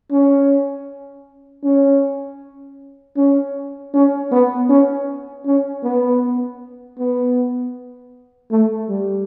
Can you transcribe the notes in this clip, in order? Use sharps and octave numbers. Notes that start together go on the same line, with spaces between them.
C#4
C#4
C#4
C#4
B3
C#4
C#4
B3
B3
A3
G3